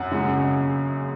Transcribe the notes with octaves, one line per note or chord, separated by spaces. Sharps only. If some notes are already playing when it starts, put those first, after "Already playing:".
Already playing: F#2 F#5
C#3 G#3